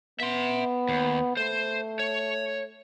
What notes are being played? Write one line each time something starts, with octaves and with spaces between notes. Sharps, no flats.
B3 E5 C6
D#2
A3 C5
C#5